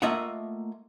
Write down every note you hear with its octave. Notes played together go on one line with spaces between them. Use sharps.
A3 A#3 F4 D#5 E5 F#5